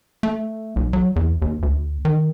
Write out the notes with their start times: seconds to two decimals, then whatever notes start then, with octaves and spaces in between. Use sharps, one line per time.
0.23 A3
0.76 B1
0.93 F#3
1.16 E2
1.42 D#2
1.63 D2
2.05 D#3